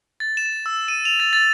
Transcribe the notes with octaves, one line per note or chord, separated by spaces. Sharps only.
A6
E7
E6
D#7
F7
A6
A6